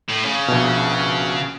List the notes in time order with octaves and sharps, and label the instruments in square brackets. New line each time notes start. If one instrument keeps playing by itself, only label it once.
[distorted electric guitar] A2
C#3
[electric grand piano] A#1 B2